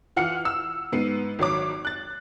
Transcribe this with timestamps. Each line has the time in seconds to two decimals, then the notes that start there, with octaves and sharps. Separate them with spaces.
0.16 E3 F4 F#5 F6 C#7
0.45 E6
0.92 G#2 B3 C7 D#7
1.39 G#1 F#3 C#5 D6
1.85 F#6 A6